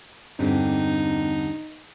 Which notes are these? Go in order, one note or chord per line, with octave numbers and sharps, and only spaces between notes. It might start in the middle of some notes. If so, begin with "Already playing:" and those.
E2 G2 D3 C4 D4 D#4 G4